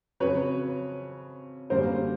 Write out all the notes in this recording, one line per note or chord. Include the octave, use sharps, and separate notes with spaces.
F2 C#3 F#3 B4 C#5
F#2 D3 G3 A#3 A#4 C5